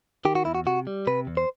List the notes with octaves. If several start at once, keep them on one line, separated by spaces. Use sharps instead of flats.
D#3 G4
F#4
E2 E4
F#4
C3 F#4
G3
C3 B4
E2
C5